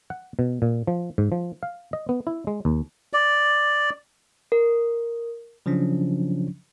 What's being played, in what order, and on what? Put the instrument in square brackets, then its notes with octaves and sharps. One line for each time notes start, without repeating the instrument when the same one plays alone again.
[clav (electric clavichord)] F#5
B2
A#2
F3
G#2
F3
F5
D#5
B3
E4
G#3
D#2
[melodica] D5
[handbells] A#4
[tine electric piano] C#3 F3 F#3 C#4 D4